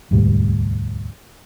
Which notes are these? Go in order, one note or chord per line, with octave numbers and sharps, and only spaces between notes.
E1 D2 G#2 G3